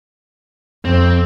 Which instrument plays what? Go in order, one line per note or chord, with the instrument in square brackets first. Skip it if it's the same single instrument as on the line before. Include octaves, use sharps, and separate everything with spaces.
[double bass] F2 [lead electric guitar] C4